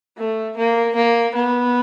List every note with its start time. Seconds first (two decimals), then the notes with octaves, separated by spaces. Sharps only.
0.17 A3
0.56 A#3
0.95 A#3
1.35 B3